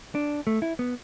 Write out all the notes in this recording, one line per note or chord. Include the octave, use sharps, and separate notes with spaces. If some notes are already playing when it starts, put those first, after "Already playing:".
D4
A3
E4
B3